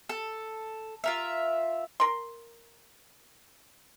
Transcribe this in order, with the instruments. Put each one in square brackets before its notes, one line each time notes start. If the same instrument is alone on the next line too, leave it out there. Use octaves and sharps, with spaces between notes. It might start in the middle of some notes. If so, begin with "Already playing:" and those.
[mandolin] A4
F4 A#4 E5
[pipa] A#4 C6